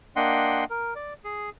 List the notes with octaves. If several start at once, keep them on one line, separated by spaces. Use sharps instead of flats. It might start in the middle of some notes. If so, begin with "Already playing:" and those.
A#3 D4 D#5 F#5 G5 C6
A#4
D5
G#4